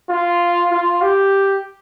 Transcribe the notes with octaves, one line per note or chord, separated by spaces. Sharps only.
F4
F4
G4